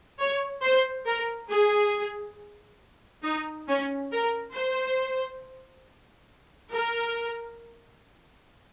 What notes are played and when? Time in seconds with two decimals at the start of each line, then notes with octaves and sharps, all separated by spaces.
0.19 C#5
0.63 C5
1.07 A#4
1.50 G#4
3.24 D#4
3.68 C#4
4.12 A#4
4.55 C5
6.73 A#4